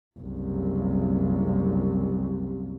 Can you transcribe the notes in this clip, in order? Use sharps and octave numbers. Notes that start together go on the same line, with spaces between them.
F#1 C2